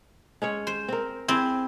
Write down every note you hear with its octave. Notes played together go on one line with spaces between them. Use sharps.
G#3 C#4 C#5
C5
C4 A#4
C4 E4 G#4